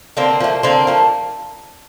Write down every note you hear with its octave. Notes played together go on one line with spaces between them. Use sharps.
D3 A#3 C4
F3 A3
D3 A#3 C4
F3 A3